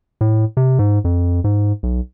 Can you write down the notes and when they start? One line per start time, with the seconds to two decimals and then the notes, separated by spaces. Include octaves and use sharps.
0.21 A2
0.57 C3
0.79 G#2
1.04 F2
1.44 G#2
1.83 B1